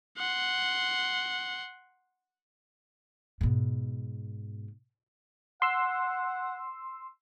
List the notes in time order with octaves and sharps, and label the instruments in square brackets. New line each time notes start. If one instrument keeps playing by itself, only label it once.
[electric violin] F#5 C6
[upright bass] G#2 B2
[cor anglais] F#5 [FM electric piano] C6 E6